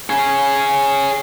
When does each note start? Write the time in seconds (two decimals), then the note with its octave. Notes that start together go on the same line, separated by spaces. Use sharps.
0.09 G#4 C#5